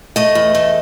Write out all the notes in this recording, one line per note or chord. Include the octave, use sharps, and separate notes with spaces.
A3 D#5
E2
A3